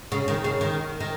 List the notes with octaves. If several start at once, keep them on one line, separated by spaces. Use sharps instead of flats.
C#3
D#3
C#3
D#3
D#3